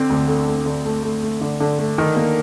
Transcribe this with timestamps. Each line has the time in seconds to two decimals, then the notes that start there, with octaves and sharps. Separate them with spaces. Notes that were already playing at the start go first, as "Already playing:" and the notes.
Already playing: D3 C4
0.10 D2
0.28 A3
0.47 A3
0.66 D3
0.85 A3
1.03 A3
1.23 A3
1.41 D3
1.60 D3
1.79 A3
1.98 D#3
2.16 A#3